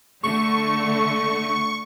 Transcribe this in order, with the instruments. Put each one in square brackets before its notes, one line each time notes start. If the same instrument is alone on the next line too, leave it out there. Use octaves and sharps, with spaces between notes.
[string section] D3 A3 [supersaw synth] C#6